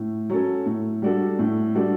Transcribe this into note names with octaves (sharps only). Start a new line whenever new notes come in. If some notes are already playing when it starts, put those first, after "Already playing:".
Already playing: A2
F#3 C#4 F#4 A4
A2
G3 D4 F#4 A4
A2
G3 D4 F#4 A4